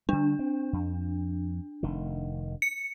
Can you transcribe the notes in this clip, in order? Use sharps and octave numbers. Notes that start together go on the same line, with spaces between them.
D3 G3 D4
C4
F2
F1 D#3
C#7